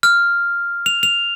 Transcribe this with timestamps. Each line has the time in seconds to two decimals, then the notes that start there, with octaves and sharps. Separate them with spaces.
0.03 F6
0.86 F7
1.03 F7